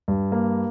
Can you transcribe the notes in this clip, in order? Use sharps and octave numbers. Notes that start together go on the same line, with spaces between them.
G2
A#3